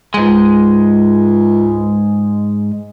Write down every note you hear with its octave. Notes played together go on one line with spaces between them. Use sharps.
C#2 G#2 G#3